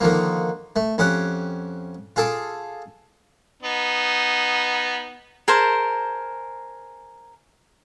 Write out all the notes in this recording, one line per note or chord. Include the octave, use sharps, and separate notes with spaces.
D3 D#3 F3 A#3
A3
F2 C#4 G4 F#5
F4 G#4 A4 A5 D6
B3 D#4
G#4 A#4 C5 A5